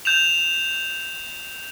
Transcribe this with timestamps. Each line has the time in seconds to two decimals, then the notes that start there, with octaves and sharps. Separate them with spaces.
0.05 G6 E7 F7